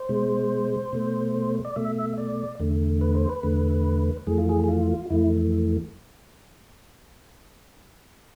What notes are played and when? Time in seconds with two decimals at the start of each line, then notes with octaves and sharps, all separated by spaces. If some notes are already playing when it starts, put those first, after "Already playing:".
Already playing: C5
0.09 B2 G#3
0.92 B2 A3
1.65 D5
1.76 B2 A3 E5
2.18 D5
2.59 E2 D3 A3
3.01 B4
3.15 C5
3.29 B4
3.43 E2 D3 A3
4.27 F2 E3 A3 G#4
4.38 F4
4.49 G#4
4.64 G#4
4.68 F4
5.10 F2 E3 A3 E4